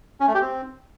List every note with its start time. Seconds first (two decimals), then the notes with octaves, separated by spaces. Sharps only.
0.20 C#4
0.27 A3
0.35 G4
0.42 C4